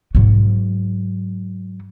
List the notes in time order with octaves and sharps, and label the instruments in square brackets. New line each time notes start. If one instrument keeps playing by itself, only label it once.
[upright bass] G#2 F#3